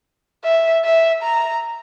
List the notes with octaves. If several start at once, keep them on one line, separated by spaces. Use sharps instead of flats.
E5
E5
A#5